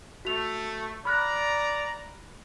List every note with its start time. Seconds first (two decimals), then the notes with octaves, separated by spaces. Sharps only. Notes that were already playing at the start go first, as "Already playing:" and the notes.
0.25 A3 F#4 F7
1.05 D5 A#5 B5 F6 F#6